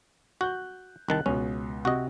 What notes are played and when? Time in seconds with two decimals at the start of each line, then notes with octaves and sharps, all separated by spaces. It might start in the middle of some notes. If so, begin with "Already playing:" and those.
0.41 F#4 F#6 G6
1.08 C2 D#3 A5 F#6
1.26 C#2 B2 C#4
1.85 C3 F#4 D#5